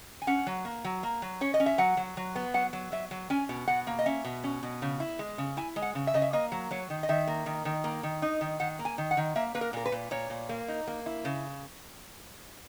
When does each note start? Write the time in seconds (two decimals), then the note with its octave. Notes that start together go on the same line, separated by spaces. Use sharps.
0.22 G#5
0.27 C#4 F#5
0.47 F#3
0.65 A#3
0.84 F#3
1.03 A#3
1.22 F#3
1.41 C#4 C#5
1.54 D#5
1.60 C#4
1.66 E5
1.78 F#3 F#5
1.97 F#3
2.17 F#3
2.36 B3
2.54 F#3 F#5
2.73 F#3
2.92 F#3 E5
3.11 F#3
3.30 C#4 G#5
3.49 B2
3.67 B2 F#5
3.87 A#3
3.99 D#5
4.06 C#4 E5
4.25 B2
4.44 C#4
4.63 B2
4.82 C#3
5.00 E4
5.19 G#3
5.38 C#3
5.57 E4 G#5
5.76 G#3
5.82 F#5
5.95 C#3
6.07 E5
6.14 C#3 D#5
6.22 E5
6.33 A#3 D#5
6.52 F#3
6.71 F#3 C#5
6.90 D#3
7.03 D#5
7.09 D#3 E5
7.27 A#3
7.46 D#3
7.65 D#3
7.84 A#3
8.03 D#3
8.22 D#4
8.41 D#3
8.60 D#3 F#5
8.79 A#3
8.85 G#5
8.98 D#3
9.11 F#5
9.17 D#3
9.36 A#3 E5
9.55 A#3 B4
9.61 A#4
9.73 A#2 A#4
9.86 B4
9.92 A#2
10.11 A#2 C#5
10.30 A#2
10.49 A#3
10.68 D#4
10.87 A#3
11.06 E4
11.25 C#3